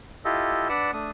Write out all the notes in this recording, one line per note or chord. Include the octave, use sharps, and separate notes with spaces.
E4 F4 G4 A4 D#5
D4 B4 D5 F#5 E6
A3 D4 D#6